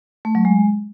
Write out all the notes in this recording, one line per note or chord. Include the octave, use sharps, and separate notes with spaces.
A3
F#3
G#3